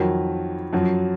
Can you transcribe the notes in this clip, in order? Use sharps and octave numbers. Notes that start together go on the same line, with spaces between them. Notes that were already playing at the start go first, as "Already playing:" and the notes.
Already playing: F2 D#3 F#3
F#2 F3 F#3